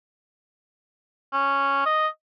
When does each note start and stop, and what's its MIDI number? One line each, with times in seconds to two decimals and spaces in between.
1.33 1.84 61
1.86 2.08 75